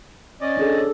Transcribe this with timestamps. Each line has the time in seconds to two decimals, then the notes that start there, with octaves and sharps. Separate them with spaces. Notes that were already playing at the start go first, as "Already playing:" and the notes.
0.41 C#4 D5 D#5
0.57 D4 G#4 A4